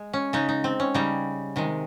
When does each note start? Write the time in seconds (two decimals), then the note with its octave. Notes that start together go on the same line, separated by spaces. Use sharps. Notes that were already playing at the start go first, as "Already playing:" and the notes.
Already playing: G#3
0.13 C#4
0.33 C#3 G#3 D#4
0.49 D#4
0.64 C4
0.80 C#4
0.94 C#3 G3 D#4
1.56 C3 D#3 G#3